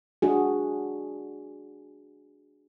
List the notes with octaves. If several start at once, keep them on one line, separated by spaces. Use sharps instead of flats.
D4 F#4 G#4